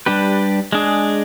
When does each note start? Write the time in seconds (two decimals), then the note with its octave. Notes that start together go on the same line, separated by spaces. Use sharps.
0.06 G3 D4 G4 B4
0.72 G#3 D4 G#4